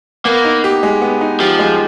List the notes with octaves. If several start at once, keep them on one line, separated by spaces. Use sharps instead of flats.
A#3 B3
D#4
G4
G#3
B3
D#4
F3 G4
G#3